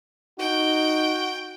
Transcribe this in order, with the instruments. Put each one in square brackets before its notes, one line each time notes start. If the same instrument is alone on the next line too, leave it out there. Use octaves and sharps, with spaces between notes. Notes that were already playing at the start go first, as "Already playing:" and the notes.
[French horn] D#4 [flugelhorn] F#4 [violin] G5